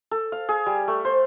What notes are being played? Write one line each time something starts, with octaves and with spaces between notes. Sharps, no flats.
A4
F5
G#4
G3
A3
C5